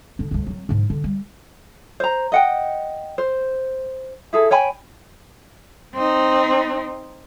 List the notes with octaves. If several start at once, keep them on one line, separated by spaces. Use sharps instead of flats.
D3 D4
D2 G2
F#3 C4
G#2 F3
D3
G3
C5 A#5
D#5 F#5 G5
C5
E4 G#4 A4
C#5 G5 G#5 B5
C4 D#4